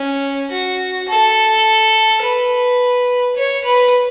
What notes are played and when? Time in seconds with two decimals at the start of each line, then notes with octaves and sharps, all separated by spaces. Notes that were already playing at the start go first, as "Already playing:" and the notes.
Already playing: C#4
0.51 F#4
1.08 A4
2.22 B4
3.36 C#5
3.64 B4